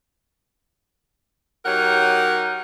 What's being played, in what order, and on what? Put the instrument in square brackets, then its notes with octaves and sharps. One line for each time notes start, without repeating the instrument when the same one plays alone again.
[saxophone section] F#3 D#4 G4 A#4 C#5 F#5